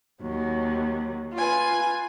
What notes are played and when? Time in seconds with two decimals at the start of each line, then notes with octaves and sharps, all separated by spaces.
0.21 D#2 F#3
1.34 F4 B4 G#5